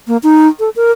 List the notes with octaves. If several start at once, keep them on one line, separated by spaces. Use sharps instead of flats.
A#3
D#4
A4
A#4